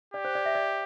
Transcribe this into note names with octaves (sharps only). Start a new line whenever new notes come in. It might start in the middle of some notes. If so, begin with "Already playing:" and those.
G4 D5
C5
D5
E5
D5